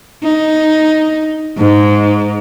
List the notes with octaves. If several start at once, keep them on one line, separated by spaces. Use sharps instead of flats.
D#4
G#2